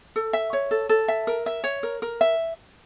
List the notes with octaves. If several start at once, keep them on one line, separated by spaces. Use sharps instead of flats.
A4
E5
C#5
A4
A4
E5
A#4
E5
C#5
A#4
A#4
E5